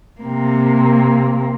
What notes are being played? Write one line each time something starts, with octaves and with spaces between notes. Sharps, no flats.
C3 A#3